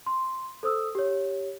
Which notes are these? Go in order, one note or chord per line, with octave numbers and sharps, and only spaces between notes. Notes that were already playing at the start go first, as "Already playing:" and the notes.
C6
A4 C5 D#6 E6
G4 C#5